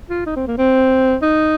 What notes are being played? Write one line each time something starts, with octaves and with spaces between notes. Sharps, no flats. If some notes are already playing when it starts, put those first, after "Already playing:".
F4
D#4
C4
A#3
C4
D#4